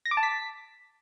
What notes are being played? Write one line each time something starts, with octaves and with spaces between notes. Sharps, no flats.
A#6
D6
A5
B6